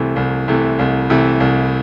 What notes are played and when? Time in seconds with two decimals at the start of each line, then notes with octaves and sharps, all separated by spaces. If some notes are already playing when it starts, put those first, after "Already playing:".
Already playing: C2 C3 E3 A3
0.16 C2
0.48 C3 E3 A3
0.79 C2
1.10 C3 E3 A3
1.40 C2